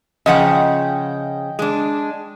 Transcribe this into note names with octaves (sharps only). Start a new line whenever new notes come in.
C#3 F3 D#5 F#5 G5
G#3 D4